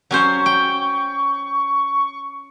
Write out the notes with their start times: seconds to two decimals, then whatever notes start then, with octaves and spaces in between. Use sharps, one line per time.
0.11 F#3 C#4 C5 C#6
0.46 G5